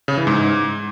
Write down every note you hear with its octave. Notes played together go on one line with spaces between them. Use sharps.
C#3
E3
G#2